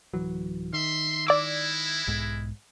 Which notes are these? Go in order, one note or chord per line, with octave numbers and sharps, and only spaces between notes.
D1 E3 F#3
D#3 E5 C6
G#3 E4 D5 D6 E6
B1 G#2